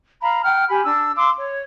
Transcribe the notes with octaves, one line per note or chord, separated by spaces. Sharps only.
F5 A#5 B5
F#5 G5 F6
G4 G#5 B5
D4 E6
F5 C6 D6 E6
C#5